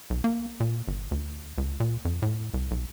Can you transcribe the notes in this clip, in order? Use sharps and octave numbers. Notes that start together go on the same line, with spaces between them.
B1
A#3
A#2
G1
D2
C#2
A#2
F2
A2
C2
B1